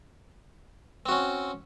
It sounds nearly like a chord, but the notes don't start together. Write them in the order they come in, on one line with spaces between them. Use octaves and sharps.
C4 F#4 C#4